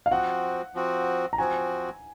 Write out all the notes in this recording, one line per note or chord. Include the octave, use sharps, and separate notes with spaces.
F5
F3 C4 F#4 F#5
F3 C4 F#4
A#5
F3 C4 F#4 G#5